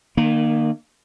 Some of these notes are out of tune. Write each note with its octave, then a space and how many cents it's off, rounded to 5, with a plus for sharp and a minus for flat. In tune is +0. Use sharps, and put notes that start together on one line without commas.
D#3 -30 A#3 +0